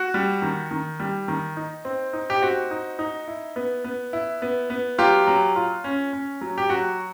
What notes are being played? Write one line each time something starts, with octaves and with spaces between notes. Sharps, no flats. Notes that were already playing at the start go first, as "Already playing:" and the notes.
Already playing: F#4
G3
D#3
D#3
G3
D#3
D#4
C4
D#4
G4
C4 F#4
D#4
D#4
E4
B3
B3
E4
B3
B3
F#3 F4 G4
F#3
F4
C#4
C#4
F#3
G4
F#3 F#4